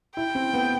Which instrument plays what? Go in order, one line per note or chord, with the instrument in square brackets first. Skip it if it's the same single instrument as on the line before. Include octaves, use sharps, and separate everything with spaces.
[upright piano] E4 [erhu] G5
[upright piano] C4
B3